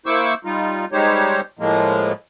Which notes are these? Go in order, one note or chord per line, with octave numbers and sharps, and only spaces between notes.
A#3 E4 C5 C#6 D6 E6
G3 D#4 F4
G3 G#3 D#4 G4 C5 C#5
A2 F3 G#3 A#3